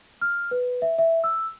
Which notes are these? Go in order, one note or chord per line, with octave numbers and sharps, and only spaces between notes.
F6
B4
E5
E5
E6